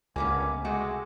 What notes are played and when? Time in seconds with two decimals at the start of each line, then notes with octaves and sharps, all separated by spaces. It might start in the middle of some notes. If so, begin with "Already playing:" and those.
0.16 G1 C#2 A#3 B3 C#4 G#5
0.65 C3 G#3 A3 F#4